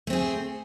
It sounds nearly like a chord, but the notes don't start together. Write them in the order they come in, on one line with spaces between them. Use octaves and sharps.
A3 C4 G#4